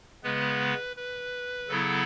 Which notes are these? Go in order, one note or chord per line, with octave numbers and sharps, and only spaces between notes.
C#3 G#3 B3 B4
B4
C#3 F#3 B3 E4 A4